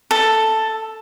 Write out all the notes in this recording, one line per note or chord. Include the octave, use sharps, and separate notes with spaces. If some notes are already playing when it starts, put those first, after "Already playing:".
A4